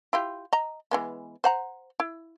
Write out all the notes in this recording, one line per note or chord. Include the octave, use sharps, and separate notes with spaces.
E4 F4 G4
D#5 A#5
E3 G#3 B3
C5 F#5 A#5
E4